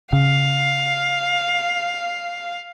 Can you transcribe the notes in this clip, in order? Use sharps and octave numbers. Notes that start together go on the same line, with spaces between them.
C#3 F5